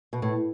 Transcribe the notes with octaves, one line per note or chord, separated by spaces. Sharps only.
B2
A2